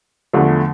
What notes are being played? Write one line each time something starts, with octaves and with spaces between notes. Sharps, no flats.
E2 D3 F3 A3